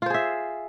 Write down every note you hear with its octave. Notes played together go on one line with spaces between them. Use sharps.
F4 G#4 C5 E5